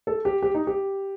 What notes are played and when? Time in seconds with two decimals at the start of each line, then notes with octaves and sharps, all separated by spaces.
0.07 A4
0.25 G4
0.42 G4
0.54 D#4
0.67 G4